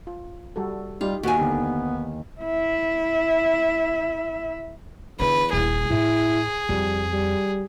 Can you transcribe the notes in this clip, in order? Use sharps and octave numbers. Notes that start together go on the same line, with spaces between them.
F4
G3 F#4 A4
G3 D#4 F4 G4
D#2 F#4 G#5
D3 B3 D#4 G4
E4 E5
E2 D3 D4 B4
D#1 E4 G#4
A2 E4
F2 G3
G3